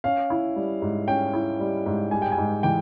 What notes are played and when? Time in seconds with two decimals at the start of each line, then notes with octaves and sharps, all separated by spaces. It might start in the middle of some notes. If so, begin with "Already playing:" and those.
0.04 C#4 F5
0.30 E4
0.56 G3
0.82 G#2
1.07 C#4 G5
1.33 E4
1.59 G3
1.86 G#2
2.11 G3 G#5
2.22 G5
2.32 G#5
2.38 G#2
2.63 E3 G5